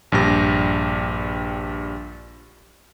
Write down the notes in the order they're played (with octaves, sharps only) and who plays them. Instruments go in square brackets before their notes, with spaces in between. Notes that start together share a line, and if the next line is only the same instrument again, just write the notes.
[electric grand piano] A#1 G2 G4 A#6